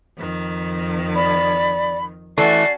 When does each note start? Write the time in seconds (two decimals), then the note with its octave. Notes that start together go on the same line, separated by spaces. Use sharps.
0.16 F2 D#3
1.15 D5 B5
2.38 E3 A3 C#4 F#4 A4 D5 C7